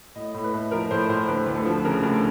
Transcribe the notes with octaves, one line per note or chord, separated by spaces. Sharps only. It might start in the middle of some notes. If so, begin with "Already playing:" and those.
A2 D#5
A2
B4
A3
F3 A#4
A2 C5
A2 C5
D2 B4
D2
A4
F3
C#3 A#4
D2